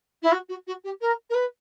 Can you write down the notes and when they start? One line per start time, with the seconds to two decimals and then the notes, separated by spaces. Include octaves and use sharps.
0.22 E4
0.31 F#4
0.48 F#4
0.66 F#4
0.84 G4
1.01 A#4
1.29 A#4
1.34 B4